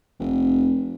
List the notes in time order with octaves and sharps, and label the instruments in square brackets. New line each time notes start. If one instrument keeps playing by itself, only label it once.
[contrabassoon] F1